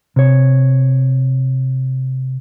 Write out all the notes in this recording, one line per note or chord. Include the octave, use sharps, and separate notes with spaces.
C3 C#5